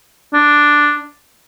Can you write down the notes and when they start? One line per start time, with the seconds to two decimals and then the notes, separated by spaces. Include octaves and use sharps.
0.33 D4